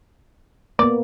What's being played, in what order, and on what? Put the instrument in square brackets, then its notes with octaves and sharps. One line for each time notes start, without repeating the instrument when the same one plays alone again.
[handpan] A#3 B3 [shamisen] D5